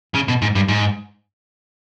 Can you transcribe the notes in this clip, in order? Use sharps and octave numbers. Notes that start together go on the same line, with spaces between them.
C#3
B2
G#2
G2
G#2